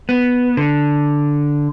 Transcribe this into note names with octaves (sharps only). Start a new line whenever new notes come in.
B3
D3